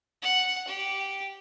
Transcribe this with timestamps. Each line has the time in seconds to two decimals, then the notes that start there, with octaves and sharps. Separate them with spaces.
0.22 F#5
0.67 G4